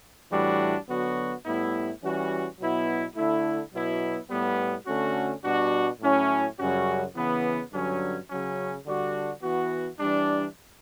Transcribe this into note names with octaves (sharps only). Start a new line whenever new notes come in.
A2 E3 G3 D4 F#4
D3 F#3 B3 F#4
A2 G3 B3 E4
E3 G3 C#4 F#4
B2 F#3 B3 E4
D3 A3 E4
B2 F#3 B3 E4
A2 G3 B3
D3 A3 C#4 F#4
B2 G3 D4 F#4
A2 F#3 C#4 E4
F#2 C#3 G3 C#4 F#4
C#3 E3 B3
G2 D3 F#3 C#4
C#3 F#3 C#4
D3 G3 D4 F#4
E3 B3 F#4
E3 G3 D4